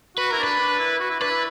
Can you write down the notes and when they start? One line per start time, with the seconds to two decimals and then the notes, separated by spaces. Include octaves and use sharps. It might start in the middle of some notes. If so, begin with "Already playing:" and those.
0.17 F#4 B4
0.30 E4 A#4
0.39 D4 B4
0.60 D4
0.79 E4
1.00 F#4
1.10 E4
1.21 D4 B4
1.30 E4